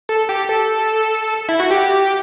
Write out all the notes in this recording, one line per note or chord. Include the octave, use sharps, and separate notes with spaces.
A4
G4
A4
E4
F#4
G4